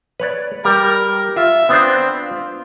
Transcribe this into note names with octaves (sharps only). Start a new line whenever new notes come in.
B4 C#5 D5
G3 A#4 G5
F4 E5
B3 C4 D4 C5
F4